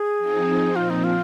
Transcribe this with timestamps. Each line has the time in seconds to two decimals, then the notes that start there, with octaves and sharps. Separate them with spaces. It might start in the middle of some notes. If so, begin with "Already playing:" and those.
Already playing: G#4
0.19 F3 C4 D#4
0.76 A#2 F3 C4 F4
0.90 D#4
1.04 F4